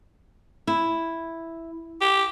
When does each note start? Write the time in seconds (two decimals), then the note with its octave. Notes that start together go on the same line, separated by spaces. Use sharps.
0.67 E4
2.01 G4